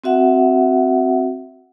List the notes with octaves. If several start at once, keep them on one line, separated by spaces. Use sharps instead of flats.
C4 F#4 E5 F#5